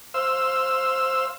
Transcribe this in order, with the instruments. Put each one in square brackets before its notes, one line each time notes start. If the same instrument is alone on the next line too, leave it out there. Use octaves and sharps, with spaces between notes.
[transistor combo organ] C5 F5 E6